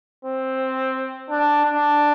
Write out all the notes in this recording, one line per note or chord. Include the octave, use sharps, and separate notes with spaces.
C4
D4
D4